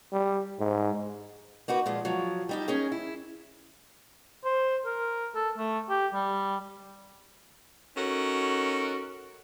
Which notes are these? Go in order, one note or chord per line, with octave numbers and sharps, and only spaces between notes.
G3
G#2
A#3 D#4 F#4 B4
A#2 F3 G#3
F3 F#3
G3 D#4 G4
C#4 D#4 G#4 A#4
E4
C5
A#4
A4
A3
G4
G3
C#4 D#4 F#4 A4 A#4